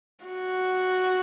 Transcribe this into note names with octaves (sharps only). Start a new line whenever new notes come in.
F#4